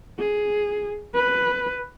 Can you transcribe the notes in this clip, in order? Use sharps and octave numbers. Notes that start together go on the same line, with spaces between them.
G#4
B4